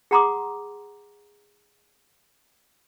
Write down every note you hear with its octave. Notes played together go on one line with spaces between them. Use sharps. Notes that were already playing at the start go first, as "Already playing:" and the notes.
G#4 F#5 A#5 C6 D6 D#6